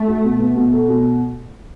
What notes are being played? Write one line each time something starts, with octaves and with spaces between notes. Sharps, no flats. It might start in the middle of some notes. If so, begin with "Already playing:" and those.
Already playing: A3
F#4
B2
B3
B2
A4
B2